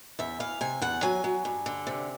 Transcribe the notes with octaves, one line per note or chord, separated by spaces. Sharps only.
E2 E5
E3 F5
C3 G#5
E2 F#5
F#3 G#5
F#3
G2
D3
C3